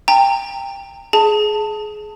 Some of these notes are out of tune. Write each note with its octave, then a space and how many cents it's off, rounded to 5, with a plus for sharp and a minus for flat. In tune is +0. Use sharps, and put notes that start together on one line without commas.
G5 +20 A#5 -25
G#4 +25 A5 +15